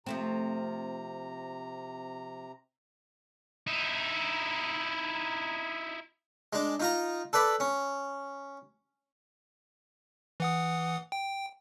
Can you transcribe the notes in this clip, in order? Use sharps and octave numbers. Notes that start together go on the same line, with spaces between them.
C3 F3 A3 C4 A#5
D#4 E4
G#3 D4
D#4 F4 A#5
A4 B4 D5 B5
C#4
E3 F#5 D#6
G5